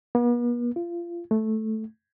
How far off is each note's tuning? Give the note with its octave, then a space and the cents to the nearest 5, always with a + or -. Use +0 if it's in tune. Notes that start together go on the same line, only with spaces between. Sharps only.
B3 -45
F4 -25
A3 -5